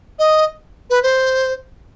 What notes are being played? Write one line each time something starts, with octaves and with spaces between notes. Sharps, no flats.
D#5
B4
C5